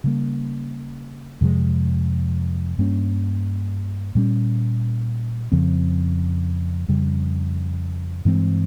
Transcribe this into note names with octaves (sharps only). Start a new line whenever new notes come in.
C#3 G3 A#3
F2 C3 F3 G#3
G2 G3 A#3 C#4
A#2 G3 C#4
F2 C#3 F3 C4
F2 C#3 G3
G2 E3 G#3 C4